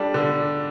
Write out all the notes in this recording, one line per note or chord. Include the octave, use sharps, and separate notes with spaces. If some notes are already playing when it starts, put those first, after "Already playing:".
Already playing: G3 D4 A4
D3